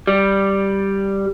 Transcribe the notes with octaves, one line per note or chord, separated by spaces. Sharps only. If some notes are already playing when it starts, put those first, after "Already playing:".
G3